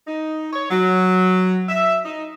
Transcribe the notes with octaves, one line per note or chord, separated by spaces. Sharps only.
D#4
C#5
F#3
E5
D#4